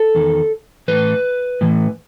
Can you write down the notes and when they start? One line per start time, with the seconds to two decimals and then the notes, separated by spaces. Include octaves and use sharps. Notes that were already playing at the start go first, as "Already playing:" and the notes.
Already playing: A4
0.15 E2 D#3
0.88 A2 E3 B4
1.61 A2 E3